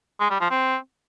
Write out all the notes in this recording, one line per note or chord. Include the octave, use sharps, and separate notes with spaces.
G#3
G3
F3
C4